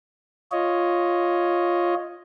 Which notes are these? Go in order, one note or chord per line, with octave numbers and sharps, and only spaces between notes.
F4 C#5 D#5